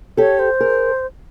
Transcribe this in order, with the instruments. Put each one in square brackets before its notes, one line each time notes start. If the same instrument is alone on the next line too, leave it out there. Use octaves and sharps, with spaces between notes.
[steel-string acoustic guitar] G4 A4 [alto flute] C#5
[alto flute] C5
[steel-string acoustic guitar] G#4 A#4